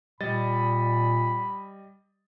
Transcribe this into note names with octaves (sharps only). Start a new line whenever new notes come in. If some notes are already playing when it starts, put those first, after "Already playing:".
A#2 G3 D#5 B5 A6